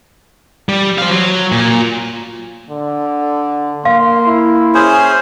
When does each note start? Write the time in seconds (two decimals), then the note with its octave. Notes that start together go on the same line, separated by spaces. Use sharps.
0.69 G3
0.98 C5 F5
1.11 F#3
1.52 A#2
2.70 D3
3.85 A#3 F5 C6
4.27 E4
4.75 C#4 G#4 C5